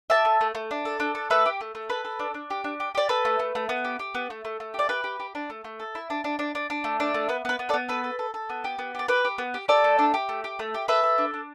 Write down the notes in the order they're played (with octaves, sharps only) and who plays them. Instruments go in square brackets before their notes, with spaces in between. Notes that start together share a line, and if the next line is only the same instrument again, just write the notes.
[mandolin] G4 E5 A5
A3
A3
A3
D4
A4
D4
A4
A3 B4 E5
G4
A3
A3
A4 B4
A4
D4
D4
G4
D4
G4
G4 D5
A4 B4
A3
A3
A3
B3
G4
G4
B3
A3
A3
A3
G4 D5
G4 B4
G4
G4
D4
A3
A3
A4
E4
D4
D4
D4
D4
D4
A3
D4
A3
B3 B4
B3 B4
B3
A4 D5
B3
A4 B4
A4
A4
A4
B3
G4
B3
G4 D5
G4 B4
G4
B3
G4
G4 A4 D5
A3
D4
G4
A3
G4
A3
G4
A4 B4 E5
A4
D4
D4